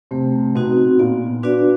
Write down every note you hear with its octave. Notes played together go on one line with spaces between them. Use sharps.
C3 A3
B2 C4 D#4 F#4
A#2 B3
D4 F#4 B4 D5